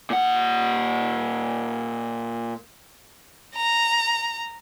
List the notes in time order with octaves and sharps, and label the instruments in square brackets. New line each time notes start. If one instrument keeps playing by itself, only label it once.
[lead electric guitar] A#2 F#5
[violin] A#5